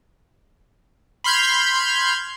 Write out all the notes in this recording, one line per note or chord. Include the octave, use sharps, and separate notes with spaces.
B5 C6 F6 G6 G#6